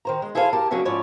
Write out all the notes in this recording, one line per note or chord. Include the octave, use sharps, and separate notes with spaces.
D#3 C5 A#5
G#3
E4 G#4 A4 C5 C#5 F5
G4 A#4 A5
C#3 F#3 A#3 C#4 D4 E5
G#2 F3 C#4 E4 C#5 D5